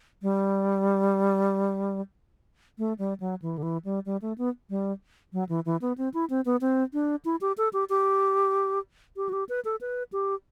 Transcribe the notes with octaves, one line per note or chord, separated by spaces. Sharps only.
G3
A3
G3
F#3
E3
D3
E3
G3
G3
A3
B3
G3
F#3
E3
E3
B3
C4
E4
C4
B3
C4
D4
E4
G4
A4
G4
G4
G4
F#4
G4
B4
A4
B4
G4